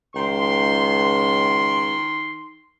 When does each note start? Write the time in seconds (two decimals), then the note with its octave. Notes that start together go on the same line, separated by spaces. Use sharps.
0.15 C#2 D#3 C6